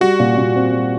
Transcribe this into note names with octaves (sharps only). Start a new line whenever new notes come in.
G3 F#4
A#2
A#2
C4
G3